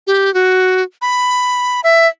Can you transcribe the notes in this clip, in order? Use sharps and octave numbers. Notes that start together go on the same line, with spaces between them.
G4
F#4
B5
E5